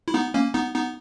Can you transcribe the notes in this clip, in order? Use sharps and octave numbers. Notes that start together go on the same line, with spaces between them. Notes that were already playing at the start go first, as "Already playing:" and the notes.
E4
B3 D#4
A#3 C#4
B3 D#4
B3 D#4